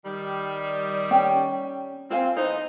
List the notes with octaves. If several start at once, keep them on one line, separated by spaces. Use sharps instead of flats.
D#3 G3
C#4 G5
C4 F4 F5 G#5
E3 B3 D#4 C5